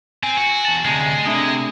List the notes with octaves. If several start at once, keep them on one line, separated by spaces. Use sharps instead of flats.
C4 G#5
F#4
E2 A5
D2 C3 G#3 G#5 C7
C3 A3 D4 D#6